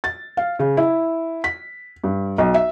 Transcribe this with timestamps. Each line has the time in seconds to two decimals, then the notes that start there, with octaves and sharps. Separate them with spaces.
0.04 A6
0.37 F5
0.59 C#3
0.77 E4
1.44 B6
2.04 G2
2.38 B1
2.54 E5